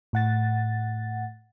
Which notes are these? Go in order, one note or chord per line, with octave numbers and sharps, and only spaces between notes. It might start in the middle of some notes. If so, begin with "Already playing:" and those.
A2 F#5 A6